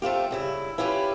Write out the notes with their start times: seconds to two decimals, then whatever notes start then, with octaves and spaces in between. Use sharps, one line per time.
0.02 A3 C4 F4 G4
0.31 G2 C#3 E4
0.78 C#4 E4 F4 G4 G#4 B4